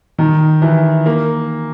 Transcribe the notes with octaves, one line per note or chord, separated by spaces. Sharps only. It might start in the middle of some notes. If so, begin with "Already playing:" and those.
D#3
E3
A#3